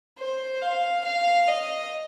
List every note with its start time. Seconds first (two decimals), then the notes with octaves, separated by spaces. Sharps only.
0.19 C5
0.61 F5
1.04 F5
1.48 D#5